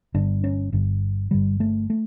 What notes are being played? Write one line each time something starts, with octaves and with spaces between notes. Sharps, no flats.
G1 G2 D3 D4
C#4
G1 G2 D3
G1 G2 D3 G3
A3
A3